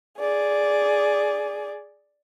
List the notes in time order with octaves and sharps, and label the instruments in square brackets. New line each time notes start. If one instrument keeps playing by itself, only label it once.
[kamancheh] G#4 D5